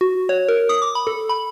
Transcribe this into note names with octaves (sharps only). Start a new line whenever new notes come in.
F#4
C#5
A#4
D#6
D6
B5
A4
B5